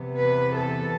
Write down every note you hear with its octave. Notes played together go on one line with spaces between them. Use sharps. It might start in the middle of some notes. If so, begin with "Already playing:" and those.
Already playing: E2 C3 E3 B3
B4
A4